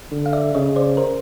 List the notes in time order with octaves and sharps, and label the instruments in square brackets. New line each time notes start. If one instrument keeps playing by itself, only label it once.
[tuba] D3
[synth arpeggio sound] F5
D5 E5
[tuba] C#3 [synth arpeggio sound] C#5 D#5
[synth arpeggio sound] C5 D5
A#4 C5